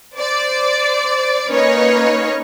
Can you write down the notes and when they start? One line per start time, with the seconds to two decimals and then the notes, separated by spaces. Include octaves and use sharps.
0.15 C5 D5
1.48 A#3 C#4 D#4 B4 C#5 D#5